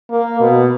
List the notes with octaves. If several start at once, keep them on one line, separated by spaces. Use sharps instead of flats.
A#3
B2